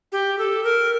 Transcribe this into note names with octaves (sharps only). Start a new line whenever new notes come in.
G4
A4
A#4